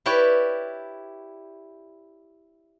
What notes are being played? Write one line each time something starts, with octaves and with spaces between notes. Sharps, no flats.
E4 G4 B4 C#5 D5